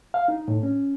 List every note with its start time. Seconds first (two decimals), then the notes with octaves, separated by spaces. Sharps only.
0.14 F5
0.28 D#4
0.48 A2
0.63 C#4